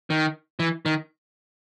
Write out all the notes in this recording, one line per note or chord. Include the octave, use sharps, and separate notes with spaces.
D#3
E3
D#3